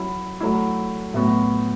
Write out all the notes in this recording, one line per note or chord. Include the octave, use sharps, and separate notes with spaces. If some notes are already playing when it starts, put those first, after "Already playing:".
Already playing: F#3 C#4 E4
F#3 A3 E4
A2 F#3 B3 F#4